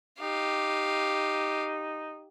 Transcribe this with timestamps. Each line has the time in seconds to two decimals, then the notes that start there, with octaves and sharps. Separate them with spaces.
0.21 D#4 G4 F5